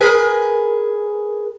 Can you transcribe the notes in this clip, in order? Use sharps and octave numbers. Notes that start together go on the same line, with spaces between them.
G#4 A#4 B4